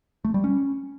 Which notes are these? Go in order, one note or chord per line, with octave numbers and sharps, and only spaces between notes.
A3
G3
C#4